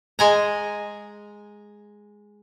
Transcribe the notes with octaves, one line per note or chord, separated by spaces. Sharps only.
G#3 G#5 A#5